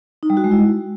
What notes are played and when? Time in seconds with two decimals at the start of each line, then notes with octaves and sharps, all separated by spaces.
0.23 D#4
0.30 G3
0.37 F#4
0.44 G#3
0.51 E4